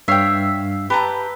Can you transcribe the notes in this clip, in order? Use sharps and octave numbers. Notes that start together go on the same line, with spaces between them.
G2 C#5 E5 F5 G5 C7
G4 B4 A5 A#5